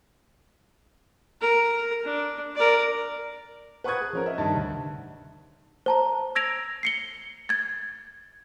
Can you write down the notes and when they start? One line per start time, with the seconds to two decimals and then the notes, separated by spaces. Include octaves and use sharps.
1.41 A#4
2.04 D4
2.56 A#4 D5
3.84 B4 F#5 C#6 D#6 F#6 G#6
4.01 G#4
4.13 F3 C#4 A#4
4.26 D#5 E5
4.38 G2 D#3
4.56 D2
5.86 C5 A5 A#5
6.35 E6 G#6 A#6 D7 F7
6.83 C7 C#7 G7
7.49 G#6 A6